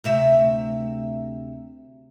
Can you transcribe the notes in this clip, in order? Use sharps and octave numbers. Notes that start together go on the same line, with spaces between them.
D2 C3 E5